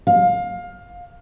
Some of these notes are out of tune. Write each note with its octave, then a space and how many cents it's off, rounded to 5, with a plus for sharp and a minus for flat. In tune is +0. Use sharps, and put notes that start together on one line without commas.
F5 +20